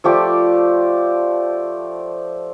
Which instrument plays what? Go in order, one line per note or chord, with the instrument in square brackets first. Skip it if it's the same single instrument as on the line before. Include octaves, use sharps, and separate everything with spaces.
[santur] F3 A3 G4 D5